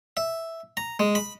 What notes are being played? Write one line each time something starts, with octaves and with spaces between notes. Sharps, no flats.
E5
A#5
G#3
B5